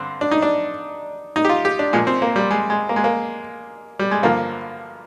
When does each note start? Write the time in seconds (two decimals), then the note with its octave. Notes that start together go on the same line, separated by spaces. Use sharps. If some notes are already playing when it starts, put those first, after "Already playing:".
Already playing: G2 D3 C4
0.21 D4
0.31 D#4
0.42 D4
1.36 D#4
1.45 G4
1.49 F4
1.65 G4
1.79 D4
1.93 A#2 F3 G#3
2.07 C4
2.22 A#3
2.36 G3
2.51 G#3
2.70 G#3
2.89 A#3
2.96 G#3
3.04 A#3
3.99 G3
4.11 G#3
4.23 G2 D3 F3 A#3